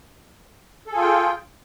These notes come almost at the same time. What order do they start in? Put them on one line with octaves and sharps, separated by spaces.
A4 G#4 F4 G5